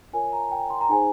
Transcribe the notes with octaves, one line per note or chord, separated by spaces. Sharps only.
F4 A#4 C#5 G#5
A#5
G5
C6
A#5
D#4 G#4 C5 G#5